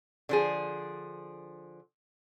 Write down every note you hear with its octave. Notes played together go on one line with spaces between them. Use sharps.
D3 F3 G#4